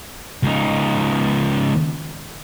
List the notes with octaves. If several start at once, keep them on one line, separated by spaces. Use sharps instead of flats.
C#2 D#4